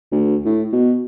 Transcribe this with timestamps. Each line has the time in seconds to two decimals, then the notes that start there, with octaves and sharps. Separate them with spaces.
0.12 D2
0.46 A2
0.73 B2